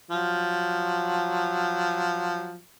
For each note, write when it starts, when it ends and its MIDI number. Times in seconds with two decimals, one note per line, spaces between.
0.11 2.58 53
0.11 2.58 54